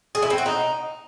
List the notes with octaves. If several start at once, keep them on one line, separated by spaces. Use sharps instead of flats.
G#4
E4
C4
F#4
D#4